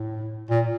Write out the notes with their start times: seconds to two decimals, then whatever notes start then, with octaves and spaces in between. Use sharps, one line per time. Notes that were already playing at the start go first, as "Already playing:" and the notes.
Already playing: A2
0.50 A#2